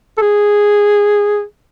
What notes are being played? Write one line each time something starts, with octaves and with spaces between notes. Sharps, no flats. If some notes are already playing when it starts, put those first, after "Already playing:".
A4
G#4